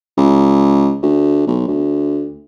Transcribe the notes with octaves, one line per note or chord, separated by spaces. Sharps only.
C#2
D2
B1
D2